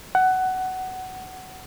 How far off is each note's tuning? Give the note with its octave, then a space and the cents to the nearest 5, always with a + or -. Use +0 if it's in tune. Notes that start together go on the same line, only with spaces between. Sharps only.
F#5 +15